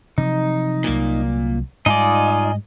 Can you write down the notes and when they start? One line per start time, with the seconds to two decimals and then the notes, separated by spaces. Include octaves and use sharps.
0.18 C3 F3 F#3 D#4
0.84 C2 A#2 F#3 A#3
1.86 G#2 G3 D#4 F4 D5 D#5 G#5